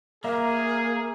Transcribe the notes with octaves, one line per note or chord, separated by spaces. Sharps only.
A#3 G#4 A#4 E5